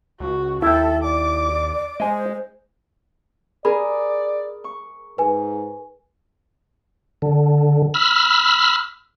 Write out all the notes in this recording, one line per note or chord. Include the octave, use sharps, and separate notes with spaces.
C#2 F#4
D#2 E4 A4 E5 G5
D5 D6
G#3 C5 D#5 G#5
G#4 A#4 D5 B5
C#6
G#2 B4 G#5
D3
B5 E6 F6